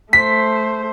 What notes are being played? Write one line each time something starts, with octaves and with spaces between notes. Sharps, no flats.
A3 C5 B6